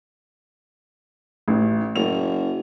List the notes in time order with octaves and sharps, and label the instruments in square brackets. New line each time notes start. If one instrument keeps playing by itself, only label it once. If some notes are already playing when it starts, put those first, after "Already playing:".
[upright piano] A1
[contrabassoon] F#1 [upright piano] F7